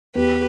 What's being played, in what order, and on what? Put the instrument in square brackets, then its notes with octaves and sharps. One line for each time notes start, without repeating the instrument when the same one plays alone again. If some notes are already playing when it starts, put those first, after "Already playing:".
[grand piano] E2 [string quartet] G4 B4